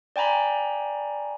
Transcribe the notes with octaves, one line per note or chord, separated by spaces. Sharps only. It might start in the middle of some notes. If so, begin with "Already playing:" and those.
D5 G5 G#5 A#5 B5